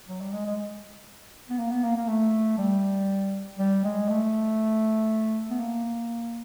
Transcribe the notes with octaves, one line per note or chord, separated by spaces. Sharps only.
F#3
G3
G#3
G#3
B3
A#3
B3
A#3
A#3
A3
G3
G3
G#3
A3
B3
A#3